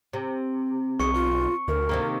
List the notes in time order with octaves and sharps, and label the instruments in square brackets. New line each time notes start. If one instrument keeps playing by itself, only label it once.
[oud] C3
[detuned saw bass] B1 [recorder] G#4 [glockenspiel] C#6 C#7
[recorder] F4 [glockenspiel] C#6
[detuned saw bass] D2 [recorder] A#4
[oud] C3 D#3 A#3